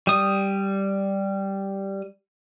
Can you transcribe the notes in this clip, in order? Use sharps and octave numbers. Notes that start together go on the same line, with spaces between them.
G3 D#6